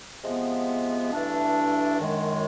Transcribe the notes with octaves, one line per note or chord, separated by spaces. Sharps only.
C3 F3 G#3 B3
G2 E3 A3 D4
F#2 D#3 G#3